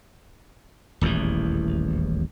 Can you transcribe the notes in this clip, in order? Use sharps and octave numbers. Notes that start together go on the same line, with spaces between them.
D#1 A1 E2 E3